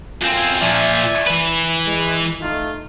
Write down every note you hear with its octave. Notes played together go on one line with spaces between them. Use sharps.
B1 F#2 C4 F4 G#5
A#2 F3 D5 E5 G#5
E3 B4
G#3 E4
A3 D#4 F4